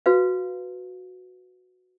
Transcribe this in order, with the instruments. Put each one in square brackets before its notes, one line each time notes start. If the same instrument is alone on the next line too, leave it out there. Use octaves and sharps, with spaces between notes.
[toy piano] F#4 B4 F5